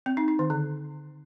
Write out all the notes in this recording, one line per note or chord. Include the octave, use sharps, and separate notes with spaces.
C4
D#4
D#4
D#3
D3